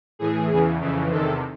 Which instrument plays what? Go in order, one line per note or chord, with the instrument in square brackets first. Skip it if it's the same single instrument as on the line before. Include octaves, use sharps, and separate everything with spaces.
[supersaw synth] A2 E3 G#4
E2 C#3 E3
F2 C#3 E3
E2 C3 D#3 A4